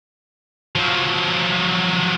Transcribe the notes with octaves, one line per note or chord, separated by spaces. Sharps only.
F3 F#3